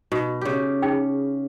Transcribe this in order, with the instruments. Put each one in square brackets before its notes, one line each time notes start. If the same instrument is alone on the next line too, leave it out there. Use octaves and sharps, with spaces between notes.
[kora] B2 [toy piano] D#4
[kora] C#3 G4
[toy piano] D#4 G#4 G5